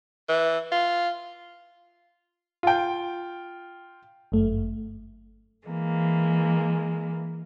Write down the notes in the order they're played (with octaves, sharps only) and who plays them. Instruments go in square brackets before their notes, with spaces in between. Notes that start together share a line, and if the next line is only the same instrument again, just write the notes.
[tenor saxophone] E3
F4
[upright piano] F4 G5
[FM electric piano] G1 F#2 A3
[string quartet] E3 G#3 A#3